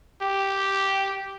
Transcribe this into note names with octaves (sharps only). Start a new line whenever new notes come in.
G4